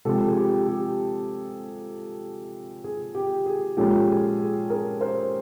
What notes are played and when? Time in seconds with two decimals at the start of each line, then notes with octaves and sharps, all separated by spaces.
0.05 C3 F3 G#3 G4 A4
0.28 G#4
0.37 G4
0.68 G4
2.84 G#4
3.15 G4
3.46 G#4
3.77 A#2 F3 G#3 C#4 G4 A4
4.08 G#4
4.39 G#4
4.70 G#4 A#4
5.01 A#4 C5